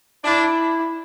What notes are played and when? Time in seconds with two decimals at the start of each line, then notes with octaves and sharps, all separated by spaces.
0.25 D4 E4